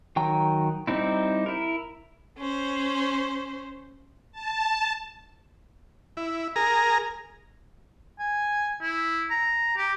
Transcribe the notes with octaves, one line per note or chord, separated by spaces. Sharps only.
D#3 F#3 G5 A#5
G3 C4 D#4 E4
E4 A#4
C#4 C5
A5
E4
G#4 A#4 A#5
G#5
E4
A#5
G4